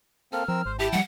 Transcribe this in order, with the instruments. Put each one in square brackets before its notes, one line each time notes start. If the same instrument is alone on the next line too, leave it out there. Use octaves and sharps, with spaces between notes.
[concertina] A#3 C4 A4 [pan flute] F6
[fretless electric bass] F3 [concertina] C4 A#4 E6
[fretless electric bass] G#1 [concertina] C5
[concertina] E4 G5 A5 [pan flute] G4
[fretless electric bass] F3 G3 [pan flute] F#5